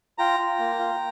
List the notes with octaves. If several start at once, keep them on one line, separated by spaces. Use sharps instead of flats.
F4 G5 A#5
F4
A#3
F4